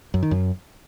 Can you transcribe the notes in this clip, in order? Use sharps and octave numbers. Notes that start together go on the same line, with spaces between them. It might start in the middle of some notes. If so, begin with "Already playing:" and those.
F#2
D#3
F#2